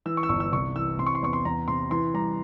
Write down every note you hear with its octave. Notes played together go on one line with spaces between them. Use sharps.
E3 E6
C#6
E6
G1 C#6
E6
C2 C#6
E3 E6
C3 C6
C#6
C6
E2 C#6
C6
E2 A#5
C3 C6
E3 C6
G3 A#5